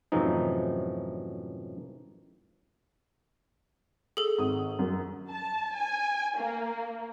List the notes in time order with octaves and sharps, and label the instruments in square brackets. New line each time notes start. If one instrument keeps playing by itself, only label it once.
[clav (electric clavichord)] F#2 A2 C3 E3 F3 D#4
[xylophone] G#4 A4
[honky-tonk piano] G#1 D#6
F#2
[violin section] A5
G#5
A#3